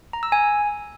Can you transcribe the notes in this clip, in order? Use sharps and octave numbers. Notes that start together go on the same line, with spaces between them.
A#5
E6
G#5